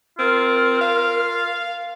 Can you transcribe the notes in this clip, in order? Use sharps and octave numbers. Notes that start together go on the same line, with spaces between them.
C4 F4 A#4
F5